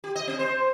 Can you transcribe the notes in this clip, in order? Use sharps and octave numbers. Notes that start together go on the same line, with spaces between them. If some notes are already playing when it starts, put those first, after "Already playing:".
G4
D#5
C4
C5